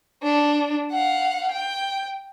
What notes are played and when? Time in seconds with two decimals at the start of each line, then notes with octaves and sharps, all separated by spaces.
0.23 D4
0.91 F5 F#5
1.52 G5